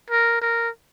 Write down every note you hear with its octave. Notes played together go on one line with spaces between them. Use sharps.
A#4
A#4